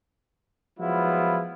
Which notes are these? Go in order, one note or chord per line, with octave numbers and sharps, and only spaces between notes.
F3 F#3 G#3 B3 E4 F4